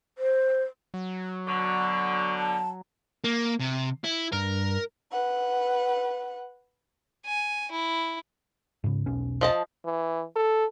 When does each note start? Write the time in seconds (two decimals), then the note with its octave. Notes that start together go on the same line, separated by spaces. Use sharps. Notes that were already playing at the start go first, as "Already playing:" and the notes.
0.18 C5
0.94 F#3
1.48 B2 D3 C#6
2.38 A5
3.24 A#3
3.60 C3
4.04 E4
4.32 G2 D4 A#4
5.12 B4 F#5
7.26 G#5
7.71 E4
8.84 G#2 C#3
9.06 E1 B1 C#4
9.41 F3 D#5 A5
9.85 E3
10.36 A4